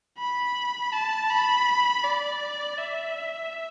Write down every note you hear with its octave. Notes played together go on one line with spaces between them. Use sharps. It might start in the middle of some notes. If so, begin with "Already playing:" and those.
B5
A5
B5
D5
E5